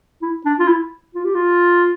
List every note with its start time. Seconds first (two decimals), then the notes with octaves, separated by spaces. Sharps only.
0.22 E4
0.46 D4
0.59 F4
0.68 E4
1.15 F4
1.25 G4
1.35 F4